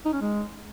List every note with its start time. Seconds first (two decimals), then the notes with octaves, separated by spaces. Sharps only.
0.05 D#4
0.13 C#4
0.21 G#3